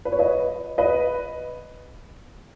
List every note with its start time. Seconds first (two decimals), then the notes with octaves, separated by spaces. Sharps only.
0.05 B4
0.12 C#5
0.19 B4 D#5
0.78 B4 D#5